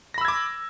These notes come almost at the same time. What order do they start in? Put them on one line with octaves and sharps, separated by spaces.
A#6 B5 E6 G#6 D6